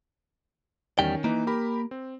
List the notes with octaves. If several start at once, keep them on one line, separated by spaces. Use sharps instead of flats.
E2 D#3 G3 C#4 G5
E3 A#3 D#4 B4
G4 A#4 B5
C4